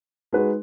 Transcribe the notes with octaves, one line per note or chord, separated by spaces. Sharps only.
G#3 D#4 F#4 B4